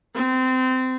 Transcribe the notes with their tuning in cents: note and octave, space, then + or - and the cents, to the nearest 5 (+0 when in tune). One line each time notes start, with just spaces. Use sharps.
C4 -25